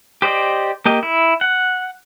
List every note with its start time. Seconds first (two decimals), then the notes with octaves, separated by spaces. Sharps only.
0.22 G4 C5 D5 D#5
0.85 A#3 G4 D#5
1.03 E4
1.41 F#5